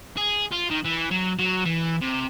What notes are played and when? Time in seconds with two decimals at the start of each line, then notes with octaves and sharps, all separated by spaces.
0.17 G#4
0.51 F4
0.70 D#3
0.85 E3
1.11 F#3
1.39 F#3
1.66 E3
2.01 C3